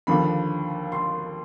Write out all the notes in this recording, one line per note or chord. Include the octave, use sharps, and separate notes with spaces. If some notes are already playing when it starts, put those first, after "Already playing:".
D#2 D3 F3 B5
C6